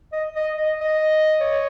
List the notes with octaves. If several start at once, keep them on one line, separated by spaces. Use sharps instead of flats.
D#5
D#5
D#5
D#5
C#5